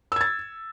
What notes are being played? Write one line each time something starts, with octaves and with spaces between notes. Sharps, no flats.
E6 G#6 A6